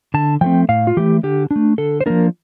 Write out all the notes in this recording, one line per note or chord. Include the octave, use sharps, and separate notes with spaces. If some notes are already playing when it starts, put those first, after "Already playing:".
D3 A5
F3 A3 C4 G5
A2 F5
F4
E3 A3 G4
D3 G4
D4
A3
D3 A4
C5
F3 A#3 D4 A#4